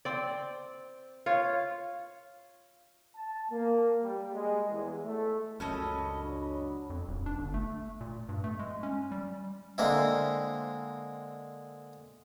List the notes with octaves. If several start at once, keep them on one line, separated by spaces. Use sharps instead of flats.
C4 D5
F4 C#5
A5
A#3
G3
G#3
E2
A3
C#2 F#2 C#4 A4 D#5 B5
F#3 D4
F2
D#1
D4
G1
A3
A#2
G2
A3
G#3
C#4
G3
D3 G#3 A#3 C4 E4